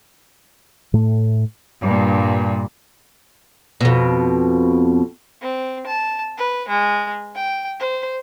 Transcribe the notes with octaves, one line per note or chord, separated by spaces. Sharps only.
A2 A3
G2 A#2
F2 B2
C4
A5
B4
G#3
G5
C5